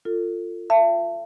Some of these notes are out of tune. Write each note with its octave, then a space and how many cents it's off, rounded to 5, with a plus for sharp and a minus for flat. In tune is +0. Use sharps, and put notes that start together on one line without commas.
F4 +0 A4 +30
F4 -10 E5 +40 A5 +20